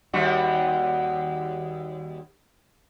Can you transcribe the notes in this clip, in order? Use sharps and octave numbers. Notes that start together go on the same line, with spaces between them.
D#2 G3 F#4